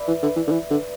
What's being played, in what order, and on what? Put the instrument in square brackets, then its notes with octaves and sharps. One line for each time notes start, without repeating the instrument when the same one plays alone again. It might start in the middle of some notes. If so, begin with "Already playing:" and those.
Already playing: [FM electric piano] B4 D5 E5
[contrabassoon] E3
D3
E3
D3
E3
D3